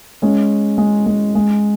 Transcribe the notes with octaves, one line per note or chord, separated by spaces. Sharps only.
G#3 C#4
G#3
G#3
G#3